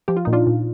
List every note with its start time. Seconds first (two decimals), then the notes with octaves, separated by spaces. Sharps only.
0.08 F3 G4
0.17 F4
0.25 A#2 D#4
0.33 D4 F4
0.47 A#2